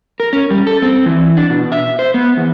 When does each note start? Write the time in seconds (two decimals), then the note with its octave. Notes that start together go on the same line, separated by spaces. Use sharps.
0.20 A#4
0.33 C#4
0.51 G3
0.67 A4
0.82 C4
1.06 E3
1.37 D4
1.50 B2
1.72 E5
1.99 C5
2.14 B3
2.37 E2